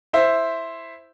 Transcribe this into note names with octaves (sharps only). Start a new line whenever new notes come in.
E4 C5 E5